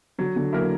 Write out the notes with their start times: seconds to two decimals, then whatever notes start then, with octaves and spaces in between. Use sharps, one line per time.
0.18 D3 F#3
0.36 D3
0.53 F#3 A#3 E4 A#4